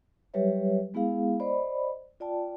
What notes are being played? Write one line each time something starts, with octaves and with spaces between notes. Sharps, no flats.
F#3 G3 G4 B4 C#5 E5
G#3 B3 E4 G#4 F5
C5 D5 D#5 B5
F4 D5 G5 A5